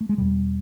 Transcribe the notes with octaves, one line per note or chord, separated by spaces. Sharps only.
A3
G#3
E2 B2 G3